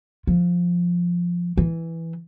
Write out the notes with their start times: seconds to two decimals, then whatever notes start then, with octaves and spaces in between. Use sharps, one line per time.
0.27 F3
1.57 E3